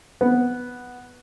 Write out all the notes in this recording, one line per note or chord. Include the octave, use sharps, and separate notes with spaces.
B3